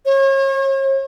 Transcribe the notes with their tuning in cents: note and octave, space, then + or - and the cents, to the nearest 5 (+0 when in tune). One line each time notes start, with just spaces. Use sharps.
C#5 -40